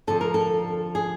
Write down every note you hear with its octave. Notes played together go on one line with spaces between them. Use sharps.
F2 D3 F3 A4
A#4
A4
G#4